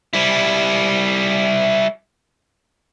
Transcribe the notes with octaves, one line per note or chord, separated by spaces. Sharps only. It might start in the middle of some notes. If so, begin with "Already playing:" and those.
G3 E4